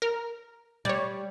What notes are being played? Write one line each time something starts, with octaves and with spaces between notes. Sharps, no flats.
A#4
G3 C#5 D5